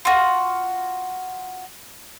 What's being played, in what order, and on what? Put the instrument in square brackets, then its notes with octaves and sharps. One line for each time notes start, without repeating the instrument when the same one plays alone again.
[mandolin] F4 F#4